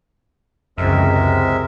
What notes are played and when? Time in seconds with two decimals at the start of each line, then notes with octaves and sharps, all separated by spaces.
0.78 C#2 F#2 C3 E3 G#3 C4 A#4 E5